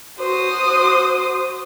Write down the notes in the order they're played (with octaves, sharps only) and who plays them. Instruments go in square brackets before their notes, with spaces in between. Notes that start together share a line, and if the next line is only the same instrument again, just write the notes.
[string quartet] F#4 C5 D#6